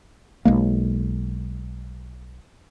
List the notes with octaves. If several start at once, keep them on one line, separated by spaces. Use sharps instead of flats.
B1 G#3 A#3